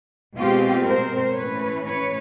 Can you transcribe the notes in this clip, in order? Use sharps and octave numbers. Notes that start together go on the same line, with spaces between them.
B2 G#3 C4 F4 G4
A#4 C5
A2 E3 A3 C#4 B4 C#5
B4 C#5